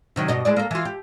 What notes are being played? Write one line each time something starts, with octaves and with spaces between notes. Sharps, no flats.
C3 D#3 F#3
G2 B2 D#5
G#3 E4 D5
A#3 A4
E3 F4
G4